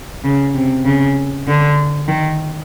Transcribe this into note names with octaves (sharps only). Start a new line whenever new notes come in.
C#3
C3
C#3
D3
D#3